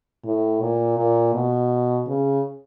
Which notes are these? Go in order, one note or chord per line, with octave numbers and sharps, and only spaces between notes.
A2
A#2
A#2
B2
C#3